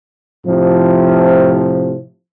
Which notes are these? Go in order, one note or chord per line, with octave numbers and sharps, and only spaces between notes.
A2 C3 F3